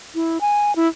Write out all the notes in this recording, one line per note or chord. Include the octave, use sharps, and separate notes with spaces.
E4
G#5
E4